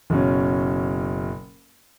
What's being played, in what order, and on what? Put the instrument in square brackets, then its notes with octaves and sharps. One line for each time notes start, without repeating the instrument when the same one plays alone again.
[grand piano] F#1 B2 C#4